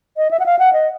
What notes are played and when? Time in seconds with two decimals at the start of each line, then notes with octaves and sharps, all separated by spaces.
0.17 D#5
0.31 E5
0.39 F#5
0.46 F5
0.59 F#5
0.73 D#5